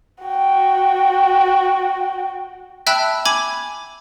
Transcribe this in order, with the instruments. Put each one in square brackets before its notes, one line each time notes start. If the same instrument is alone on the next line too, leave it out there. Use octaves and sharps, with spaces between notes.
[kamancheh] F#4 G5
[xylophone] E5 G5 A5 B5 E6 F#6
G#5 B5 D6 G#6